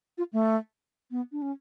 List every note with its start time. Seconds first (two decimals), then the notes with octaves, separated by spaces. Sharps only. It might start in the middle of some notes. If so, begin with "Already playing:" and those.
0.18 F4
0.33 A3
1.11 B3
1.32 D4
1.42 C#4